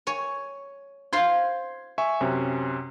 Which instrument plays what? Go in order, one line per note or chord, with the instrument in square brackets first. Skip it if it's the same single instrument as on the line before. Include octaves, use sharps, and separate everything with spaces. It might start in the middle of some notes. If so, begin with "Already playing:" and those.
[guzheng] C#5 G#5
[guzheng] F4 C5 C6 [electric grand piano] G#6
[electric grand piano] E5 G#5 C#6
F#2 C3 C#4